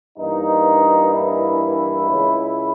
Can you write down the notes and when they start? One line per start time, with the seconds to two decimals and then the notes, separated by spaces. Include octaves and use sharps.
0.17 G2 E3 A#3 D#4
1.12 E4
2.07 C#2 C#3 G#3